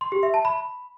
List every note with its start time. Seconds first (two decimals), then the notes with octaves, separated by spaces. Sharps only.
0.01 C6
0.12 G4
0.23 E5
0.34 A5
0.45 B5